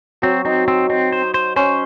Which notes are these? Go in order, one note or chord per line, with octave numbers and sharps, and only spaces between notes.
F#3 C4
C4 D#4
C4
C4 D#4
C5
C5
C#4 C5